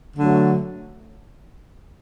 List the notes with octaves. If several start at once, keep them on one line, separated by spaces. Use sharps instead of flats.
D3 F#3 A3